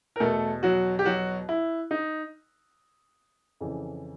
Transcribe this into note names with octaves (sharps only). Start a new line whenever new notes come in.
A#4
E2 B2 A3 A4
F#3 F#4
G4
F#3 F#4
E4
D#4
F2 C#3 E3